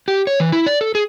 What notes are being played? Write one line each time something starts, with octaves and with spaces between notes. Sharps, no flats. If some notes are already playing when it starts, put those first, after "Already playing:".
G4
C#5
E3
E4
D5
A4
G#4